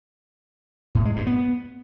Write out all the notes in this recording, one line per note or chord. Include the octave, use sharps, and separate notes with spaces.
A2
G#3
G2
B3